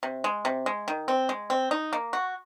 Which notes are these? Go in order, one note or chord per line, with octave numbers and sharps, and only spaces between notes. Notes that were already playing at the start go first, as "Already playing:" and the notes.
C3
G#3
C3
G#3
D#3
C4
G#3
C4
D#4
A#3
F#4